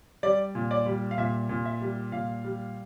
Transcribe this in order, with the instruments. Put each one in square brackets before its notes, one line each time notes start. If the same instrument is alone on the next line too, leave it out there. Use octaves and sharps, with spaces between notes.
[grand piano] G3 D5
A#2
D5
G3
F5
A#2 E5
A#2
E5
G3
A#2 F5
G3